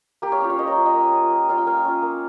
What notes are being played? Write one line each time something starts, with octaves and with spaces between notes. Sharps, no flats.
A#3 G4
C#5 F5
C#4 F4
C#5 F5
A#3 C5 D#5
A#4 C#5
C#4 F4
D#5 G5
A#3
C#4 F4
A#3
C#4 F4 F5
G5
A#3 F5 G#5
C#4 F4
A#3